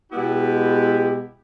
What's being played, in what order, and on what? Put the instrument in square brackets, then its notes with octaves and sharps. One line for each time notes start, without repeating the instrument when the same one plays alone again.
[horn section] B2 G#3 B3 E4 G4